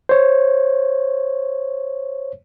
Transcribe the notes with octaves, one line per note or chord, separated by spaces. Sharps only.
C5 C#5